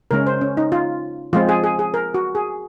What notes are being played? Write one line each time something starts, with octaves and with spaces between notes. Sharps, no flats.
C#3 G#3 C#4 A#4
C5
C#4
D#4
F4
F3 G#3 C4 F4
G#4
G#4
G#4
A#4
F#4
G#4